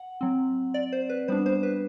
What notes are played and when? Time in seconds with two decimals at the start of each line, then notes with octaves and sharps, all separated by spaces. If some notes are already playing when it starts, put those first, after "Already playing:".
Already playing: F#5
0.21 F#3 C4
0.74 D5
0.92 C5
1.09 B4
1.28 G3 B3 D4 C5
1.46 C5
1.63 B4